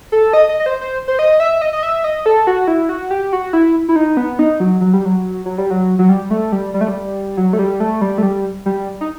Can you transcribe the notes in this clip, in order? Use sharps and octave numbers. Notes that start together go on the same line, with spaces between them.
A4
D#5
D#5
D#5
C5
C5
C5
D#5
E5
D#5
D#5
E5
D#5
A4
F#4
E4
F#4
G4
F#4
E4
E4
D#4
B3
D#4
F#3
F#3
G3
F#3
F#3
G3
F#3
F#3
G3
A3
G3
G3
A3
G3
F#3
A3
G3
A3
G3
A3
G3
G3
D#4